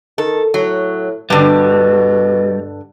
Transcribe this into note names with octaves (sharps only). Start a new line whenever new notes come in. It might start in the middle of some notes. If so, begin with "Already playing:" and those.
D#3 A4
A2 F#3
G2 B2 D3 G3